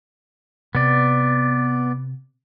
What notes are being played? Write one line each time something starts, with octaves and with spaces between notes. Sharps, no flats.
C3 B3 D5